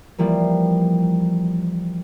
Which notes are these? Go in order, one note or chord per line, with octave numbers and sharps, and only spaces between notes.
E3 F3 G3 A#3